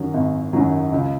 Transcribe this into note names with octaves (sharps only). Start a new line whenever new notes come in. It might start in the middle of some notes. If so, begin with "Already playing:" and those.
Already playing: F#2 D#3 F#3
G#1
F#2 D#3 F#3
C#2